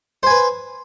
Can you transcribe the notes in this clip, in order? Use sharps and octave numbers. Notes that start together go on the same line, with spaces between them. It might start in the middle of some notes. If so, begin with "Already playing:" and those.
B4 C5 G#5